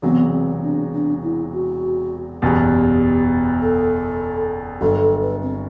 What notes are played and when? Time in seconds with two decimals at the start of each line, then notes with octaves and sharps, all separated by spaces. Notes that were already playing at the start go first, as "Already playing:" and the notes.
0.02 E1 E2 C3 F#3 B3
0.32 C4
0.63 D4
0.93 D4
1.23 E4
1.53 F#4
2.42 F#1 E2 B2 G4
3.62 A4
4.81 G1 G2 F#3 A4
5.01 A4
5.22 B4
5.42 C4